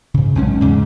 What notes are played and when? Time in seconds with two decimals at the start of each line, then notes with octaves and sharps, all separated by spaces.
0.14 G#2 C#3
0.35 B1 G#2 C#4
0.61 E2 G#2 C#3